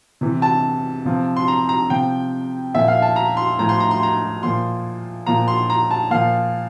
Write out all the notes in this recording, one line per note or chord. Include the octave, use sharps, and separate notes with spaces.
C3 E3
A5
C3 F3
C6
A#5
A#5
C3 F3 G5
A#2 F3 E5
F5
A5
A#5
C6
A2 F3 A#5
C6
A#5
C6
A#5
A#2 F3 C6
A#2 F3 A#5
C6
A#5
A5
A#2 F3 F5